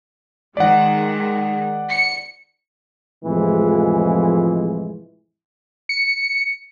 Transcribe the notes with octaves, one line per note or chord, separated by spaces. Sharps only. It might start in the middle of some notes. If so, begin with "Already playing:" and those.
D#3 G#3 D5 F#5
C#7
F2 A2 C3 E3 F3 G#3
C#7